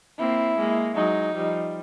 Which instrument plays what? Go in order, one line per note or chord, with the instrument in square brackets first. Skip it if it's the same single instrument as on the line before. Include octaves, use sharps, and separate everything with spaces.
[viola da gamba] A#3 C4 [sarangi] E4
[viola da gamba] G#3 A#3
[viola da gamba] F#3 G#3 [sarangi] D#4
[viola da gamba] F3 G3